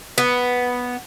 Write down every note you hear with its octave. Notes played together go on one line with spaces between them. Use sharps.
B3